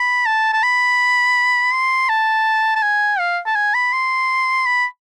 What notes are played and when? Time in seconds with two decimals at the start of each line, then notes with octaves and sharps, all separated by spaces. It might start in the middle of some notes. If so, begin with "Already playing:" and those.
Already playing: B5
0.26 A5
0.53 A5
0.63 B5
1.72 C6
2.09 A5
2.76 A5
2.82 G#5
3.19 F5
3.46 A5
3.55 G#5
3.74 B5
3.92 C6
4.66 B5